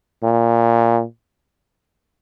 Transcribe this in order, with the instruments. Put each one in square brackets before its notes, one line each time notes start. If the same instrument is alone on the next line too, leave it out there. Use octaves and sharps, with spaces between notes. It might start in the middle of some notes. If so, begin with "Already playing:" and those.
[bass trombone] A#2